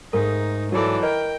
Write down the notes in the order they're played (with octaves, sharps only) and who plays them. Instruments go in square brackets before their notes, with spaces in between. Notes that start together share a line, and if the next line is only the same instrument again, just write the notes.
[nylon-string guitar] G#2 A3 [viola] D#4 [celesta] A#4
[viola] E3 D5 [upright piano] F#3 A4
[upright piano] A#4 [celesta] D#5 [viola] G5